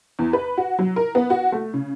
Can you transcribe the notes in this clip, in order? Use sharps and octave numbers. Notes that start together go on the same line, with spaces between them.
E2
B4
F#4
F#3
A#4
B3
F#4
A3
C#3